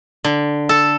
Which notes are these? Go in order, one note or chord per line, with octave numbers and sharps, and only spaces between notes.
D3
A4